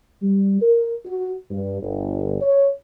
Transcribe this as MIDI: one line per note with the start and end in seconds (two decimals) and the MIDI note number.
0.22 0.61 55
0.62 0.94 70
1.05 1.34 66
1.51 1.82 43
1.82 2.38 31
2.42 2.69 73